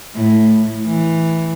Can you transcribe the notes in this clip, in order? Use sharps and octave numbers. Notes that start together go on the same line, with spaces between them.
A2
E3